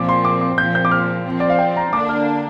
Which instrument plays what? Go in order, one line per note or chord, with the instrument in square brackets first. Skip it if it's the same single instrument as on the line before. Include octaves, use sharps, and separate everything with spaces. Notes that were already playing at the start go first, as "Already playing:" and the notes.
Already playing: [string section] A#2 F3 C4 [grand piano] D6
[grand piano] C6
D6
D6
[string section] A#2 F3 C4 [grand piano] G6
[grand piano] G6
D6
F6
[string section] F3 C4
[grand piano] D5
F5
G5
A#5
[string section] D3 A#3 D4 [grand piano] D6
[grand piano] F6